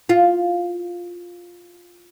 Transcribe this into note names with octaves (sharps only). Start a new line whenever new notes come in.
F4